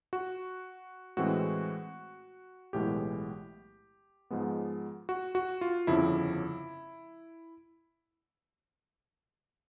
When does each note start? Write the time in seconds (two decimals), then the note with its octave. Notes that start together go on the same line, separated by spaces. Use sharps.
0.13 F#4
1.17 A2 E3 G#3 C4 F#4
2.73 B1 A2 E3 G#3 B3 G4
4.30 G#2 F3 G#3 B3
5.09 F#4
5.35 F#4
5.61 F4
5.87 G1 F2 C#3 F3 E4